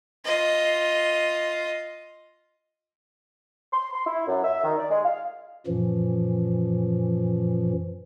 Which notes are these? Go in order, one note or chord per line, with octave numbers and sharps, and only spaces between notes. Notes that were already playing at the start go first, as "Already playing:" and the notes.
F4 D#5
C6
C6
E4
F#2
E5
D#3
D5
G#3
F5
F#2 A#2 E3 F3